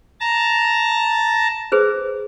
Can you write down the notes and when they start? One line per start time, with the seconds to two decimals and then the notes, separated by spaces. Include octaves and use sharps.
0.20 A5 A#5
1.72 G#4 B4 C5